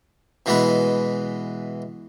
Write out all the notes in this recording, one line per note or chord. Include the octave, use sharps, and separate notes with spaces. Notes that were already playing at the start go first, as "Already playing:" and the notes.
B2 E3 G#3 B3